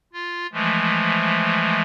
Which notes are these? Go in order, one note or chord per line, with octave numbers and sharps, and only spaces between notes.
F4
E3 F3 G#3 A3